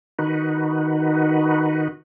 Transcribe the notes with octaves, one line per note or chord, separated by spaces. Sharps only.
D#3 D#4 F#4 B4